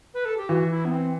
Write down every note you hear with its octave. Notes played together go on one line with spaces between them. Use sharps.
B4
A4
G4
E3 F#4
E4
B3
C4